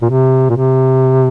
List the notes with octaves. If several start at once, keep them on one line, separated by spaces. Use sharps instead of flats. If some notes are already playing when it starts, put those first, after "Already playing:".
A#2
C3
A#2
C3